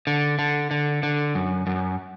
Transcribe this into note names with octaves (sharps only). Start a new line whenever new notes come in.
D3
D3
D3
D3
F#2
F#2